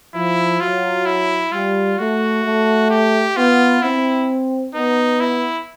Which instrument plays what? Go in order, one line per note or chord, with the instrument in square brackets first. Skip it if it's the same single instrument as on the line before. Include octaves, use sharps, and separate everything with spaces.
[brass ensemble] F3 [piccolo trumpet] E4
[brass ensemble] F#3 [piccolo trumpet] F4
[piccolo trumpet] E4
[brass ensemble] G3 [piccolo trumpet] F4
[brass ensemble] A3 [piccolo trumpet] F#4
[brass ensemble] A3
[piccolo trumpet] G4
[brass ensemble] B3 [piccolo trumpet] F4
[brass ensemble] C4 [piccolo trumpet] E4
[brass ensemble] B3 [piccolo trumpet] D#4
[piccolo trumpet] E4